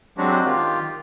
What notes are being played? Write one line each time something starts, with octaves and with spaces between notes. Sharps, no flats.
F#3 G#3 C4 D4 F#4 G4
D#3 F4 G4